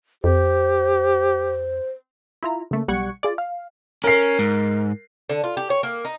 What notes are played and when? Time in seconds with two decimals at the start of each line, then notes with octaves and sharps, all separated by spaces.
0.24 F2 G4 C5
2.43 E4 F4 A#5
2.71 C#3 A3 A#3
2.88 B1 G3 F#5 C#6 G#6 C#7
3.23 F4 G#4 D5
3.38 F5
4.04 C#4 A#4 C7
4.39 G#2
5.29 D3
5.44 F4
5.57 G4
5.70 C#5
5.83 A#3
6.05 D#4